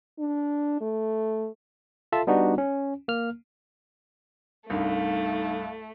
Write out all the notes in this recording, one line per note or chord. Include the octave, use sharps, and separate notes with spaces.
D4
A3
F4 A4 E5 A5
G3 B3 D4 D#4 F#4
C#4
A#3 F6
C2 G2 A3 D#4 F5